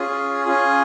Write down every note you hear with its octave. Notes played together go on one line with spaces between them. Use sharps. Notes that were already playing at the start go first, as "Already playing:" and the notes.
Already playing: C#4 F4 G#4
C#4 F4 G#4